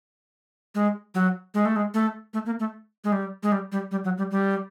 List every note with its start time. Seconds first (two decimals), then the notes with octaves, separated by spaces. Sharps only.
0.75 G#3
1.15 F#3
1.54 G#3
1.65 A3
1.76 G#3
1.94 A3
2.34 A3
2.46 A#3
2.60 A3
3.04 G#3
3.12 G3
3.43 G#3
3.52 G3
3.72 G3
3.91 G3
4.04 F#3
4.18 G3
4.31 G3